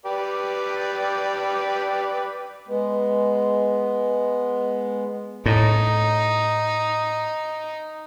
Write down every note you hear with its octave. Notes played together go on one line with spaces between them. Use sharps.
G4 B4 D5
G#3 B3
A2 D#4